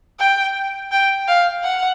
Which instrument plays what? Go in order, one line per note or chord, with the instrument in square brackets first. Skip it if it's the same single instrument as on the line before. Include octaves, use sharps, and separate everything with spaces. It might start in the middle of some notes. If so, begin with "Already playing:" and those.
[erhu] G5
G5
F5
F#5